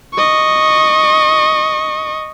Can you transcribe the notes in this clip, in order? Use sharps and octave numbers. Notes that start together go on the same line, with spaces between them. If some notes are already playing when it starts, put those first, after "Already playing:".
D#5 C#6